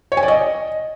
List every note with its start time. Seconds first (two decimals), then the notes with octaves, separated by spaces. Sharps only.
0.12 C#5
0.17 G#5
0.23 D5
0.28 D#5